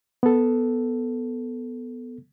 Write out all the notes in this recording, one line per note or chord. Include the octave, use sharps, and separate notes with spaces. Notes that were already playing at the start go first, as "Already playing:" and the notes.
B3 A4